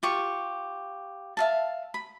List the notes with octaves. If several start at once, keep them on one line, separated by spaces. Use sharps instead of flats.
F4 G4 C#6
E5 F5 A5
B5